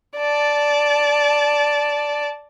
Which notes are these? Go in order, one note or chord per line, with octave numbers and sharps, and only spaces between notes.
D5 A5